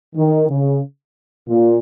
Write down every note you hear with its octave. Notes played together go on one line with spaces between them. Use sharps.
D#3
C#3
A#2